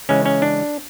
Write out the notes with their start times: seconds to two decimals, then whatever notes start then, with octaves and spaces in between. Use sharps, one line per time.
0.09 C#3 E3 G#3 C#4
0.25 C#4
0.42 D4